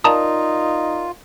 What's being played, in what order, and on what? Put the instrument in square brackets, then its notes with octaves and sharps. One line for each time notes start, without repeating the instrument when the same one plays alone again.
[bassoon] D#4 [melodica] F4 [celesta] A#4 D5 F5 [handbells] A5 A#5 D#6